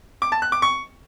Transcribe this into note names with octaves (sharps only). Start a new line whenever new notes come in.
D6
A5
F#6
D6
C#6